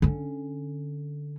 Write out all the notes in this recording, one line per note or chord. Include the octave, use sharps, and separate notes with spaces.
D3 C#4